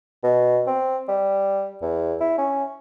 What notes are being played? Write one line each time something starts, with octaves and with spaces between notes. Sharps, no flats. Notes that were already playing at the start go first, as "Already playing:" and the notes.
B2
C4
G3
E2
E4
C#4